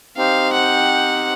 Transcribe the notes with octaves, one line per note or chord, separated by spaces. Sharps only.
C4 D#4 G4 C5 F5
F#5